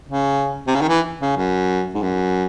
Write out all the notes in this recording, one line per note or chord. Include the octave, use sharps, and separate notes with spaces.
C#3
C3
C#3
D#3
E3
C#3
F#2
G#2
F#2